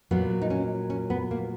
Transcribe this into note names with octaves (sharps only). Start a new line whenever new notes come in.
A#2 F#3 A#3 B3
D#4
C#4
C#4
B3
A#3